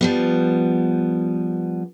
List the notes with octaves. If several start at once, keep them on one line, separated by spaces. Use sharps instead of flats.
F3 G3 B3